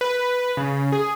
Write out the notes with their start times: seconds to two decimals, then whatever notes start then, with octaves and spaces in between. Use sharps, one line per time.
0.01 B4
0.57 C#3
0.92 G#4